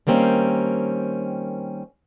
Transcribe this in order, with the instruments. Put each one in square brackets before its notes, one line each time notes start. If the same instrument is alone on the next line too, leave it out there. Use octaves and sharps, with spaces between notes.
[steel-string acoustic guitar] D#3 G3 A#3 C4 C#4